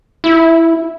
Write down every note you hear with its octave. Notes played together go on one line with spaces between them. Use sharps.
E4